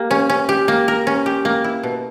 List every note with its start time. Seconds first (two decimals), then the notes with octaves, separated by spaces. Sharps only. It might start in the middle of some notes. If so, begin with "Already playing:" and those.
Already playing: A#3 G4
0.11 C#4
0.29 C#4
0.49 G4
0.68 A#3
0.88 A#4
1.07 C#4
1.26 G4
1.45 A#3
1.64 E4
1.83 B2